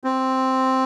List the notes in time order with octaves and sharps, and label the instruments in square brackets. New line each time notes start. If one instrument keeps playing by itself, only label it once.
[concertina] C4